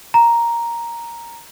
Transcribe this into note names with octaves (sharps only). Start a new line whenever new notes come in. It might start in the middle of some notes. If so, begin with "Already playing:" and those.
A#5